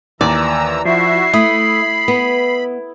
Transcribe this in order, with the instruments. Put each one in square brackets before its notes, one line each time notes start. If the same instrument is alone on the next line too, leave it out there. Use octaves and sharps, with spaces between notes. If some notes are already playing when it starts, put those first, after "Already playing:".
[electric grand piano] D#2 [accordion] E3 A#5 E6 [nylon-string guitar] D5
[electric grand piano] F3 [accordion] E4 F#4 E5 [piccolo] C7
[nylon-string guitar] A3 [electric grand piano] E4 D#6 [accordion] B5
[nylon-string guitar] B3